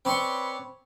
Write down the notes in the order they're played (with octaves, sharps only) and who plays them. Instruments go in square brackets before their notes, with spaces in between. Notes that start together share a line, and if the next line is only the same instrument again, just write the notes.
[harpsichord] C4 C6 C#6 [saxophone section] B4 C#5 D5